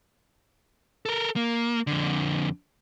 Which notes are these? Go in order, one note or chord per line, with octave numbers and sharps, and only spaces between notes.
A4 A#4
A#3
F2 D3